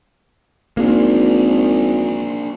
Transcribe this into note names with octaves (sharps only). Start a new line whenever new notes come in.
G#1 A#3 D4